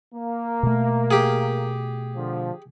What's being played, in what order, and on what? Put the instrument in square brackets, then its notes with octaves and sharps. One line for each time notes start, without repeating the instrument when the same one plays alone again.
[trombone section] A#3
[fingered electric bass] B2 A3
[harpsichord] G4 G#4
[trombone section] D3 F3